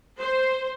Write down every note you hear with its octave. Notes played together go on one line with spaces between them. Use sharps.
C5